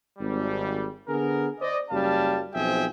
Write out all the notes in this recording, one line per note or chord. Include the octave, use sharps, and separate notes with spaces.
G#1 G3
D3 B3 G#4 A#4
C5 D5 D#5
F#1 F#2 G3 F5 A5
B1 F3 C4 G#4 E5 G5